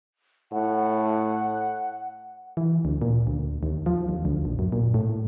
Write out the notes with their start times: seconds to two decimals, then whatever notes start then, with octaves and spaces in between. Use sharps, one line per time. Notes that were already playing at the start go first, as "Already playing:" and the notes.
0.52 A2 F#5
2.57 E3
2.85 D2
3.02 A#2
3.27 D2
3.63 D#2
3.86 F3
4.09 D#2
4.25 D2
4.45 A#1
4.59 F#2
4.72 A#2
4.94 A2